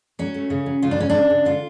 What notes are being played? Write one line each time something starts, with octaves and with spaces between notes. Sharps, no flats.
F#3 C#4
A3
C#3
F#3
C#3 F4
D4
C#3 C#4
C#3 D4
C#3
D3 F4